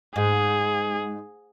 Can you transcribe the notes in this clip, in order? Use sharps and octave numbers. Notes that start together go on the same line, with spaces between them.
G#2 G#4